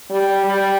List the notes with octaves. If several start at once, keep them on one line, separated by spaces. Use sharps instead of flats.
G3
G3